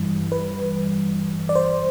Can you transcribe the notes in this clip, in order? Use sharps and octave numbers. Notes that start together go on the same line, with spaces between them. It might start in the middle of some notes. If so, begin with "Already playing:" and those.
Already playing: G2 E3 G3
B4
D5
C5